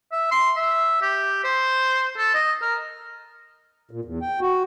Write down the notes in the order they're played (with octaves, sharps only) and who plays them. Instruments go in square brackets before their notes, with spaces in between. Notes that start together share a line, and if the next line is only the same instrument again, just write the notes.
[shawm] E5
C6
E5
G4
C5
A4
D#5
A#4
[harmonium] A#2
E2
G5
F#4